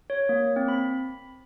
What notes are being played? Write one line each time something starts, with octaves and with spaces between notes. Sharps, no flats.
C#5
A#3
C4
B5